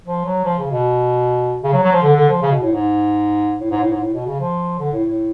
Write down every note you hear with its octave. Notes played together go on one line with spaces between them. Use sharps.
F3
F#3
F3
C#3
B2
C#3
F#3
F#3
F3
D3
D3
F3
C#3
B2
A2
G#2
A2
G#2
A2
G#2
A2
B2
C#3
F3
D3
A2
A2